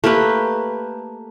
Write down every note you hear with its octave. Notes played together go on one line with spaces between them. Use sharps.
A3 A#3 G4 B4